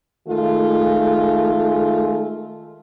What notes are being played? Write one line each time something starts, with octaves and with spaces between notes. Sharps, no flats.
D#3 G#3 A3 F4